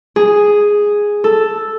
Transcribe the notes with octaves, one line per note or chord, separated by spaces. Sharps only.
G#4
A4